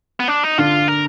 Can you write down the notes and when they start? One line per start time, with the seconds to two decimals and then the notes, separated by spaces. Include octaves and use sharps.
0.20 B3
0.28 D4
0.43 D#4
0.58 D3 D4 F4
0.88 A#4